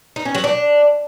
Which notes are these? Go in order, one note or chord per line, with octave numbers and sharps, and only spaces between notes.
D#4
C#4
F#3
D4